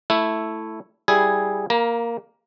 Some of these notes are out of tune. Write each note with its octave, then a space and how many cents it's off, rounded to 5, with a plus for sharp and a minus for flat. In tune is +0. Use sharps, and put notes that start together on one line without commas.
A3 +0 E4 +0
G3 +0 E4 +0 G#4 +0
A#3 +0 A#5 +30